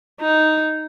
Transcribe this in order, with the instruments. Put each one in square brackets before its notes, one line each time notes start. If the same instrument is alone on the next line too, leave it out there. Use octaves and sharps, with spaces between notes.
[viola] D#4